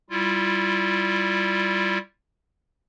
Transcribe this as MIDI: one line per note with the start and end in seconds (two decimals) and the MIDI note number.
0.10 1.98 55
0.10 1.98 64
0.10 1.98 65